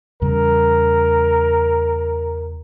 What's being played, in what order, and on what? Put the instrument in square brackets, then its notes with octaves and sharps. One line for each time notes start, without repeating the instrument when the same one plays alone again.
[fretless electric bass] E2 C#3 G3 [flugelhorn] A#4